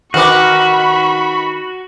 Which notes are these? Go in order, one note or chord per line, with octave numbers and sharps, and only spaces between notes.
D#3 F#4 A#4 B4 B5 C#6 D6 F#6